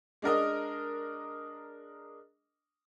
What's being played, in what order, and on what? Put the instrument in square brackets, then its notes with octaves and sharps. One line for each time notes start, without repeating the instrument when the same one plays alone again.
[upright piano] G#3 D4 A#4 D#5